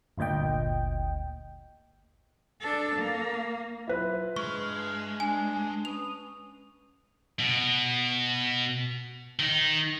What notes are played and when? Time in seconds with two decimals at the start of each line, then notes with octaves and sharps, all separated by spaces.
0.18 G1 D2 A#2 D#5 G5
2.61 D4 A4
2.96 A#3
3.87 F#3 E4 F4 B4
4.36 G2 G#3 D4 C#6 F6
5.20 D4 G#5
5.85 C#4 B4 D#6 F7
7.40 B2
9.39 D#3 D#4